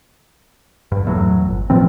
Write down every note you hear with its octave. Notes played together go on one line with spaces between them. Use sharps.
G2
E2 A2 F#3
G1
A2 E3 F3 C4